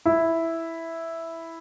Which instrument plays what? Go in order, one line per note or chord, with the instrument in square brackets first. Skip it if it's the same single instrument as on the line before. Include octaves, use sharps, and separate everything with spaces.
[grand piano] E4